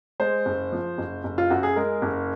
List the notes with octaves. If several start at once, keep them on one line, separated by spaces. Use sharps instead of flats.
G#3 C5
F#1
F3
F#1
F#1
F4
F#2 F#4
G#4
G#3 A#4
F#1